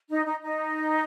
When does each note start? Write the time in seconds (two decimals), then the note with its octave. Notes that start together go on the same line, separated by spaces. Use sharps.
0.10 D#4
0.26 D#4
0.43 D#4